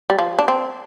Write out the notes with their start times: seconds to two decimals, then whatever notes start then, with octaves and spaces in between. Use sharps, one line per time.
0.10 G3
0.19 F3
0.39 D4
0.48 C4